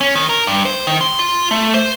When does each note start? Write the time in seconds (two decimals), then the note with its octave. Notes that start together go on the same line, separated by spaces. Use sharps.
0.01 C#4
0.15 D#3
0.29 A#4
0.47 G2
0.65 C5
0.87 D#3
1.01 C6
1.19 F4
1.51 A3
1.74 C5